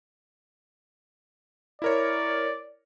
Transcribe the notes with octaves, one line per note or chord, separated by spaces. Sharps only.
E4 A#4 C#5 D5